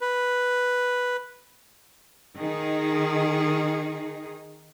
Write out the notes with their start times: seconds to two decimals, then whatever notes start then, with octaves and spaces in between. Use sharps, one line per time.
0.01 B4
2.37 D#3 D#4 G#4